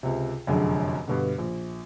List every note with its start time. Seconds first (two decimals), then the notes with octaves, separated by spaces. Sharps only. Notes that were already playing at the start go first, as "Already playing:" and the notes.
0.03 C#2 C3
0.47 F1 F#2 D3 G#4
1.08 G2 B2 D3
1.38 A#1